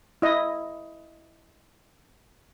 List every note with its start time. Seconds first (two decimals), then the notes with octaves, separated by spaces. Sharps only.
0.22 E4 D#5